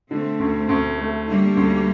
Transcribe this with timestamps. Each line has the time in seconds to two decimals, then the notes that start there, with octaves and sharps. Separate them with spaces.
0.10 D3 A3 C4
0.40 D2
0.69 D2
0.98 A3
1.28 D3 G3 A#3
1.57 D2